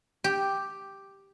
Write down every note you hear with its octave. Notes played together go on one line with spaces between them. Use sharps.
G4